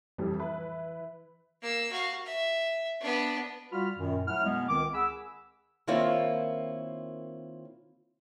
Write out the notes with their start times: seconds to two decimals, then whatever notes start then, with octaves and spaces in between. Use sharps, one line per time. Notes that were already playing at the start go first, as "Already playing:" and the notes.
0.18 F2 A2 E3 G3
0.39 E4 B4 B5
1.62 A#3 E6
1.91 F#4 F5
2.26 E5
3.01 B3 D4
3.72 G3 F4 F#4 B5 F6
3.97 F#2 A#2 D#3
4.27 F#3 A3 E4 F#5 F6
4.45 B2 G#3 B3
4.69 C#2 D#3 C4 D6
4.94 G#4 F#5 G#5 B5 E6
5.87 D#3 A#3 C4 E4 F4 C#5